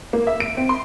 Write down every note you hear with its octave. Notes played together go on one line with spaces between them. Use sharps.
A#3
E5
D7
C4
C6